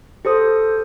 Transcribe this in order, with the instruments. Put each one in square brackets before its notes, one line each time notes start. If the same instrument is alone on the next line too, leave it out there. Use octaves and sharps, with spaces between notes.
[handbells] G4 A4 C5 D#6